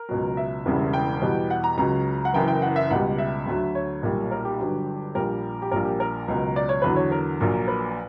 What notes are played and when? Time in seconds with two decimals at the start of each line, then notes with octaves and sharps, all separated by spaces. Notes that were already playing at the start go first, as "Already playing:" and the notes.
Already playing: A#4
0.09 C#2 B2 F#3
0.37 E5
0.66 E1 E2 C#3 G3
0.93 G5
1.22 E2 B2 G3
1.50 F#5
1.64 A#5
1.77 C#2 C#3 F#3 A#5
2.25 F#5
2.34 F#1 F#2 E3 G5
2.48 G5
2.62 F#5
2.76 E5
2.91 C#2 B2 G3 F#5
3.18 E5
3.46 D2 D3 F#3
3.75 C#5
4.03 B1 A#2 G3
4.31 A#4
4.45 G4
4.59 G1 G2 F#3
5.15 A#1 A#2 G3 A#4
5.62 G4
5.71 A#1 A#2 G3 A#4
5.85 G4
6.00 A#4
6.28 C#2 B2 F#3
6.56 D5
6.69 C#5
6.82 E2 D3 F#3 B4
6.96 C#5
7.12 A#4
7.40 A#1 A#2 F#3
7.68 B4